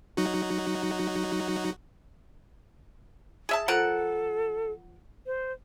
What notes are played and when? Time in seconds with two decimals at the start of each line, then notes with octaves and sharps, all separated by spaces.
0.17 F#3 D#4 F#4
3.49 G#4 E5 A5
3.68 F3 A4 A#4 F#5
5.26 C5